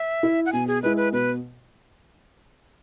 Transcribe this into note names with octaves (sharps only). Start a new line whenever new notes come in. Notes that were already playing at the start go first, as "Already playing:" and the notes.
Already playing: E5
E4
F#5
B2 G#5
G#4
G#3 E4 B4
B4
B2 B4